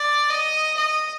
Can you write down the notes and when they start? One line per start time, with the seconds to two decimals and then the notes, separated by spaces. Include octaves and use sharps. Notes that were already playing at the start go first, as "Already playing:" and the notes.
Already playing: D5
0.30 D#5
0.77 D#5